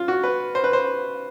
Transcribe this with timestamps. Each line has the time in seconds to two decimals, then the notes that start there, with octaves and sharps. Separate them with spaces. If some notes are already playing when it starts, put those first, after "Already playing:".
Already playing: F4
0.08 F#4
0.24 B4
0.55 C5
0.64 B4
0.73 C5